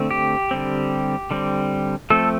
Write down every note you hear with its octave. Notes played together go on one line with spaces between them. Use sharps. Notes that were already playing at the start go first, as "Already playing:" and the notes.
Already playing: D3 A3 C4
G4
D3 G3 C4
D3 G3 C4
F3 A3 C4 A4